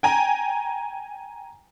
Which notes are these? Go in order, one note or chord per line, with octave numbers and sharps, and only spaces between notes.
G5 G#5 A#5